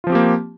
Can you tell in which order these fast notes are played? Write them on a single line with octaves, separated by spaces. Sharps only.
F4 F3 C4 G4 A#3